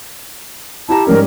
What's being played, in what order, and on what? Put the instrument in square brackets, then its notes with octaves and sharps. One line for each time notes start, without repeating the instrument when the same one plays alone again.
[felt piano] E4 G4 A#5 [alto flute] A5
[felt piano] G#2 G3 C#4 [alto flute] A#4